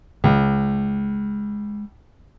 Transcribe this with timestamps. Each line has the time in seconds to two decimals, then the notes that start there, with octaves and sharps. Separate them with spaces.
0.24 C#2 G#3